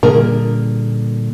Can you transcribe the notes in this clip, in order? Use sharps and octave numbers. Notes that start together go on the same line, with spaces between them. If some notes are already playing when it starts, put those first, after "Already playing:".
A#2 D3 G3 G#4 A#4